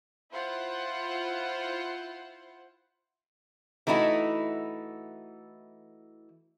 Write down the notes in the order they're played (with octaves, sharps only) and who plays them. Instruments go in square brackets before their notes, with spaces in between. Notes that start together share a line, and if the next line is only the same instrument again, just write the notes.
[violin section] E4 F4 C5 F#5
[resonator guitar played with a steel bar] E3 A3 D#4 E4 F#4